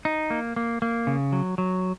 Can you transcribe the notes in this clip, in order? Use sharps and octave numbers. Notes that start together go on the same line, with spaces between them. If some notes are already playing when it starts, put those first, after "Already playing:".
D#4
A#3
A#3
A#3
C#3
F#3
F#3